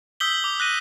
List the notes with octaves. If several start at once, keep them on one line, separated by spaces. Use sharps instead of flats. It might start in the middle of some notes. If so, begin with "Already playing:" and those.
D#6 E6 G6 B6 F#7 G7
D6
F#6 A#6 D#7